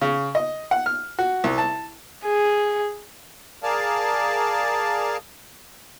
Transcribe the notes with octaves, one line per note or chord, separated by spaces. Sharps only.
C#3
D#5
F#5
F6
F#4
C2
A5
G#4
G#4 A#4 D5 F5 A5